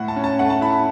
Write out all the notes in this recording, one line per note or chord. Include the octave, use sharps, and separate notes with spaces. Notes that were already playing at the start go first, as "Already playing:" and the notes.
Already playing: A2 F#5
A5
C#4
A5
A3 F#5
A5
E4 B5
B5